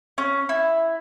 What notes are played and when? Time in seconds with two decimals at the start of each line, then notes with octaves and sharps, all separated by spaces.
0.18 C#4
0.49 E4